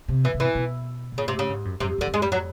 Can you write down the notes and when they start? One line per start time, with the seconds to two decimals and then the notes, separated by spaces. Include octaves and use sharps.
0.08 C3
0.24 B2 E3
0.34 C3
0.40 B2 E3
0.55 B2
1.12 B2
1.18 A#2 C#3
1.28 C3
1.33 A2
1.39 C#3
1.49 G#2
1.65 F#2
1.80 F#2 C3
1.89 F2
1.98 E2 D3
2.07 F2
2.14 G#3
2.22 G3
2.32 F#3